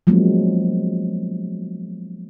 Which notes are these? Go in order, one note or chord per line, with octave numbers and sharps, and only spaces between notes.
F3 F#3 G#3 A#3 B3 C#4